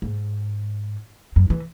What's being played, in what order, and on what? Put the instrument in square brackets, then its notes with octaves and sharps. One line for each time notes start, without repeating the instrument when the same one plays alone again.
[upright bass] G#2
F#2
E3